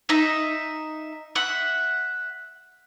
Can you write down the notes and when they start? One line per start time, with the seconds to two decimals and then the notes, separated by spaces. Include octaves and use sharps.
0.09 D#4 E5
1.35 E5 F#5